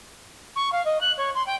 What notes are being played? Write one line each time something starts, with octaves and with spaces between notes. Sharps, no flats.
C#6
F5
D#5
F#6
C#5
C6
G5